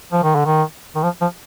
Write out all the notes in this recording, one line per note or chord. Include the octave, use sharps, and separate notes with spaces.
F3
D#3
D3
D#3
D#3
F3
F3